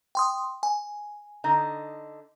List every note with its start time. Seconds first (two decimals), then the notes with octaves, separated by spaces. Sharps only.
0.15 G5 C6 D#6
0.63 G#5
1.44 D3 D#4 D#5